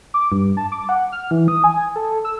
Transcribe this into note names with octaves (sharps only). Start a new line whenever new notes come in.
D6
G2
A5
D6
F#5
F6
E3
D#6
G#5
A4
E6